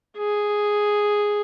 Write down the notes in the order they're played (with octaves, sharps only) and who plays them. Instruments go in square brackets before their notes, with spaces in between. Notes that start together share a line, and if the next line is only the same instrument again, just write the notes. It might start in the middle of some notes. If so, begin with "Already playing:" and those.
[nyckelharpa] G#4